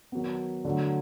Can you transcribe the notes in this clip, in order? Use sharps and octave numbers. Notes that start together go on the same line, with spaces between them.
D#3 F#3 B3
D3 F#3 A3